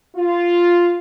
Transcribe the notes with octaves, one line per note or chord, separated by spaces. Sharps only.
F4